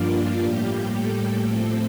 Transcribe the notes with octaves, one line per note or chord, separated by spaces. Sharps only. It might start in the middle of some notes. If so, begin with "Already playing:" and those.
Already playing: G2 F3 A#3 D4 F4 D5 F5
A2 G3 A#3 G4 G5
A3 A4
A2 F3 C4